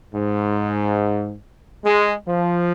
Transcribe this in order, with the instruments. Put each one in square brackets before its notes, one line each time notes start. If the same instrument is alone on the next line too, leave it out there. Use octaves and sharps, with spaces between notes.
[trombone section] G#2
G#3
F3